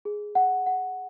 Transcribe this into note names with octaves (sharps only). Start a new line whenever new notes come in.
G#4
F#5
F#5